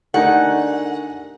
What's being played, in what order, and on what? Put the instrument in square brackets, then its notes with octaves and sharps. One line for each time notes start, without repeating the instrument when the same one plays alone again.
[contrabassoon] D3 [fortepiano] A3 D#4 [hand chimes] G4 A#4 G#5 [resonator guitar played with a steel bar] F#5